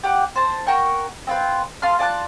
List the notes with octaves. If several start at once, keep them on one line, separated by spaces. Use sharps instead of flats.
G4 F#5 D6
C5 A5
F#4 A#4 G5 C#6
C4 F4 B4
F4 A4 C6 F6
F4 D5 A5 F#6